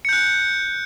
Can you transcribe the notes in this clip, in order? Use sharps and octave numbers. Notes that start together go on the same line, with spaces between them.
F#6 G6 C#7